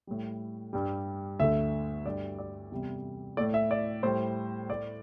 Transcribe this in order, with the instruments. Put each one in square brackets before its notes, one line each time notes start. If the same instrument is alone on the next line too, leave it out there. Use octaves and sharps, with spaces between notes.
[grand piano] A2 G3
G2 G3
D2 D3 A3 E5
G2 G3 D5
D5
E2 C3 G3
A2 A3 D5
E5
D5
A2 G3 C5
A2 A3 D5